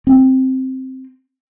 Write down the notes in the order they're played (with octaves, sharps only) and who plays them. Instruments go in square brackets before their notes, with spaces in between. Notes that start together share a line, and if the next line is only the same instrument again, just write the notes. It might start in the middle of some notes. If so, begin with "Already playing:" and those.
[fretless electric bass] C4